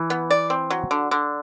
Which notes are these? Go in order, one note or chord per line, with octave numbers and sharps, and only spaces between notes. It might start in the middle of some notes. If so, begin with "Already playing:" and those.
Already playing: E3
B3
D5
C4
F#3
D3
D3